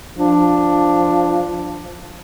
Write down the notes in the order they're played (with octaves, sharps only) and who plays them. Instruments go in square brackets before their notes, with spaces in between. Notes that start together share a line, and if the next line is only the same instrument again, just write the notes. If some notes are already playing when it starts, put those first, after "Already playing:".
[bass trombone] F3 [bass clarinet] D4